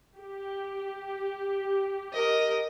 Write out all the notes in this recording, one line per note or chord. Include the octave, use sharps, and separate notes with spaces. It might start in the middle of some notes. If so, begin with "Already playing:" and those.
G4
A#4 D#5